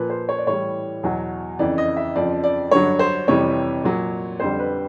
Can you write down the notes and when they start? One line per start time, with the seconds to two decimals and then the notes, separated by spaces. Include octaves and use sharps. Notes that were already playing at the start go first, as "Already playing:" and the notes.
Already playing: A#2 F3 B4
0.10 C5
0.29 C#5
0.38 D5
0.47 A2 E3 G3 C#5
1.03 E2 B2 F#3
1.59 F2 C#3 E3 D5
1.78 D#5
1.97 E5
2.16 F2 C#3 F3 D5
2.44 D5
2.71 G2 D3 F#3 C#5
2.99 C5
3.28 F2 C3 E3 G3 C#5
3.84 A#2 F#3
4.40 F2 D3 G3 C5
4.59 B4